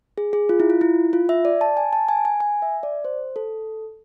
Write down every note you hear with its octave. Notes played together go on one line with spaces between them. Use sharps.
G#4
G#4
F4
E4
F4
E4
F4
E5
D5
A5
G#5
A5
G#5
G#5
G#5
E5
D5
C5
A4